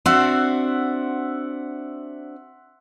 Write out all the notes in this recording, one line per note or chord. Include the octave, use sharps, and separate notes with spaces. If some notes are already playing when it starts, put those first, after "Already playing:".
C4 D4 F#4 E5 F#5 C6